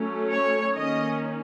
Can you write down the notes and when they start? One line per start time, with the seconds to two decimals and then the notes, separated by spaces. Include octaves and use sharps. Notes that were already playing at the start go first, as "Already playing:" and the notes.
Already playing: F#3 A3 C#4
0.31 C#5
0.75 D#3 A#3 C#4 D#5